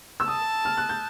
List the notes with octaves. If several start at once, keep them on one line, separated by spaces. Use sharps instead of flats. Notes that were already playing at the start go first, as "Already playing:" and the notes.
E6
A5 D#6
F6
F#6
G6